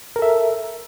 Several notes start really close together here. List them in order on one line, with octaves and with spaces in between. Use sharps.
A#4 A4 E5